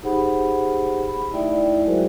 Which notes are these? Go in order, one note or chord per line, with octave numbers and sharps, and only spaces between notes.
D#4 G4 G#4 C5 F#5 B5
B5
A3 D#4 E4 D5 E5 G5
F#3 G#3 F#4 G#4 A#4 C5